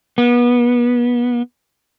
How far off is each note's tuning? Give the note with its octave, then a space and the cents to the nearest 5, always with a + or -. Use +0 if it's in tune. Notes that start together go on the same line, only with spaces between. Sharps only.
B3 -30